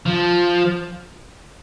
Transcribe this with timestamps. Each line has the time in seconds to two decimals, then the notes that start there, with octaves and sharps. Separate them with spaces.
0.06 F3